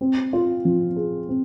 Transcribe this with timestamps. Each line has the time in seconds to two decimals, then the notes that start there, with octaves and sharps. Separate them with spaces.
0.01 C4
0.33 F4
0.65 F3
0.96 G#4
1.29 C4